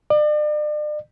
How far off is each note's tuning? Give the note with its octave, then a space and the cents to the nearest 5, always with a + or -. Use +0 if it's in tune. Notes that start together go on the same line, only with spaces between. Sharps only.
D5 +40